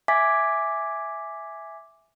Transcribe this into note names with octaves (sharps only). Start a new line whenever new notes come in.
E5 G#5 D6 G#6 A6 B6